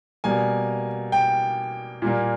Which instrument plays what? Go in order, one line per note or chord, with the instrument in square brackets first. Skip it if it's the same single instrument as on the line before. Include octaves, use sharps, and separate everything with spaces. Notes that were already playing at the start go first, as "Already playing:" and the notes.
[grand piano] B2 G3 A#3 G#5
G5
A#2 G3 A#3